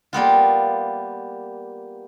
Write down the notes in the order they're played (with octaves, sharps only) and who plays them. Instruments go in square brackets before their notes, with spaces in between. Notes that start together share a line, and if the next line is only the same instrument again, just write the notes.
[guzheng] G3 A#3 B3 F4